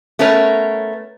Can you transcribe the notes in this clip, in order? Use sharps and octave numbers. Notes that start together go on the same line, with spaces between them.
A3 B3 C#4 A#4 B4 C#5